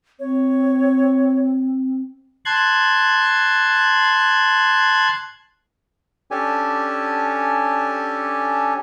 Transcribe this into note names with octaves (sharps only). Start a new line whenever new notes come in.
C4 C#5
A5 C6 F#6 G#6
C#4 D4 G4 A4 G#5